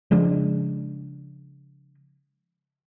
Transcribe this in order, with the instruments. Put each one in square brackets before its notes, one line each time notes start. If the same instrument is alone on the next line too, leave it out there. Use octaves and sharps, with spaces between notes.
[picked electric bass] C#3 F3 G#3 D4